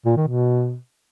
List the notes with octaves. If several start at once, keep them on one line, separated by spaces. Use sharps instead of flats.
A#2
D#3
B2